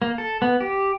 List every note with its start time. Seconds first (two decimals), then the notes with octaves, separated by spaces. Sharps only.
0.02 A#3
0.18 A4
0.42 B3
0.61 G4